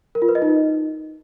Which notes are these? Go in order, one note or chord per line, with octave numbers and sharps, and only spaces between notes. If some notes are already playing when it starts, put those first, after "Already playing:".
A#4
F4
B4
D#5
D#4